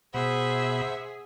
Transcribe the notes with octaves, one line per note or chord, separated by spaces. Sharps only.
B2 G#4 C5 E5 F#5 B5